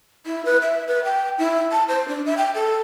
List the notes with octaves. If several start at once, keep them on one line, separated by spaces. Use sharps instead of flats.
E4
B4
E5
B4
G5
E4
A5
C5
D4
E5
G5
A4